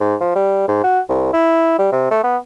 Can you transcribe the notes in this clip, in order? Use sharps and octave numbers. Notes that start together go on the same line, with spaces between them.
G#2
F3
G3
G#2
F#4
C2
E4
G3
C3
A3
B3